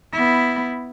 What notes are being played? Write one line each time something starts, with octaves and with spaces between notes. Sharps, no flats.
B3 E4